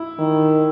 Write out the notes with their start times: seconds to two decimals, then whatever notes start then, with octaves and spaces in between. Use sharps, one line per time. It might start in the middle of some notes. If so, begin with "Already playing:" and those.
Already playing: E4
0.19 D#3